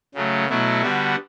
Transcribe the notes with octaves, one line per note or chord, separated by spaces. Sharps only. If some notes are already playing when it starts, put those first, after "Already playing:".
C#3 F#3 A3
B2 F#3 A3 E4
D3 G3 B3 F#4